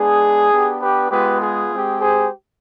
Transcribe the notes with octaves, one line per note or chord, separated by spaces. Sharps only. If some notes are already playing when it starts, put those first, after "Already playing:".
Already playing: G#3 B3 D4 G#4
B3 D4 G4
G4 B4
G#3 B3 F4 G4 B4
G#4
G#3 C4 G4
G#4 C5